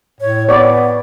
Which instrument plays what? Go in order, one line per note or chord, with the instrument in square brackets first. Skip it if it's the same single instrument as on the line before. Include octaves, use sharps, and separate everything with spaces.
[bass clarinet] A2 [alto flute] C#5
[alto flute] B3 [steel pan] C#5 D5